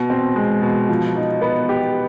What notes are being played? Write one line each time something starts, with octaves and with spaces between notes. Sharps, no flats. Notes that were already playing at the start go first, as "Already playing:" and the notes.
Already playing: B2
C4
G#3
B2
F3
D#4
B3
G4